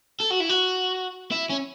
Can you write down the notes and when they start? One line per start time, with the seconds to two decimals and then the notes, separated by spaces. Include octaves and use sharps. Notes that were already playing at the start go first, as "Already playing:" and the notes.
0.20 A4
0.31 F#4
0.40 E4
0.49 F#4
1.32 E4
1.50 C#4